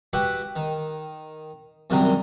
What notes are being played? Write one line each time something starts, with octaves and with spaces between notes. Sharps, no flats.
F#4 G4 B4 E5 F#5
D#3
F#2 C3 D#3 F#3 G3 D#6